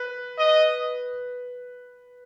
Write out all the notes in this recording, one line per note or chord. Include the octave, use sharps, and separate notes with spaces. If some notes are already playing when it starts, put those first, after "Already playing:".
Already playing: B4
D#5